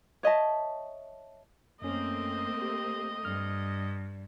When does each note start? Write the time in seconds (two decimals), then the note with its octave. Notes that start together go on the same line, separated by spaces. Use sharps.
0.23 C#5 D#5 E5 A5
1.82 F#2 A3 A#3 C4 C#4 D#5
2.62 G4
3.25 G2 F6